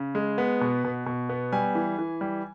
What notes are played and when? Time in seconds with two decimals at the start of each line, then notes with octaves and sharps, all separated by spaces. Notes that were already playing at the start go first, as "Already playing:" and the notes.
Already playing: C#3
0.15 G#3
0.38 B3
0.61 B2
0.84 B2
1.06 B2
1.29 B3
1.52 G3 G#5
1.75 E3
1.99 E3
2.21 G3